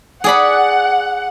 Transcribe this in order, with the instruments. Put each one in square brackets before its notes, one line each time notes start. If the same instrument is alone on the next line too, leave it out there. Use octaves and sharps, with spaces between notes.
[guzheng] G#4 D5 B5 [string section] F#5